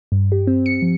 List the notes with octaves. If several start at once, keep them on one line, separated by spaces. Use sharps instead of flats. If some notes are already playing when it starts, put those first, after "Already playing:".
G2
G4
C4
C#7
F3